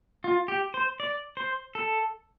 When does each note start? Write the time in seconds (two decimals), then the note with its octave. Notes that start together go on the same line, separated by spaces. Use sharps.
0.24 F4
0.48 G4
0.74 C5
1.00 D5
1.37 C5
1.75 A4